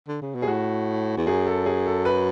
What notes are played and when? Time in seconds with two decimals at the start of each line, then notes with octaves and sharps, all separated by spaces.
0.08 D3
0.21 C#3
0.35 B2
0.42 G#4
0.48 A2 F#4
1.17 E2
1.27 F#2 G#4
1.47 A4
1.66 G#4
1.86 A4
2.05 B4